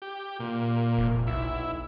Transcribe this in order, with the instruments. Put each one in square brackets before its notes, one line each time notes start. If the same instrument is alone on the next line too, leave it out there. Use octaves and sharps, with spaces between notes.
[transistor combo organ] G4
A#2
[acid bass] F1
[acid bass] B1 [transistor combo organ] E4